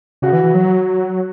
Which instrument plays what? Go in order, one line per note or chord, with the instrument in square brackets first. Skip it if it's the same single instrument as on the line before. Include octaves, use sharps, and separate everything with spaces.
[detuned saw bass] C#3 [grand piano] F#4
[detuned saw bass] E3
E3
F#3